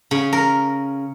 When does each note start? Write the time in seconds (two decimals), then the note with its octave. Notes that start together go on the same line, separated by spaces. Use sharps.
0.11 C#3
0.33 A#4